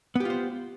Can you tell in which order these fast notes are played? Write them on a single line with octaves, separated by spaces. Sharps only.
B3 G4 F4 C5